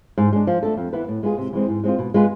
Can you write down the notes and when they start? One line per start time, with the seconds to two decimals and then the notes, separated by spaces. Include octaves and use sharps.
0.18 G#2
0.33 G#3 D4
0.47 F3
0.63 A3 D4 A4
0.77 F2
0.93 E3 B3 E4 B4
1.08 A2
1.23 G#3 B3 F4 G#4
1.38 C3
1.53 E3 G#3 C4
1.69 G#2
1.84 G#3 C4 F4
1.99 B2
2.14 G#3 B3 F4 B4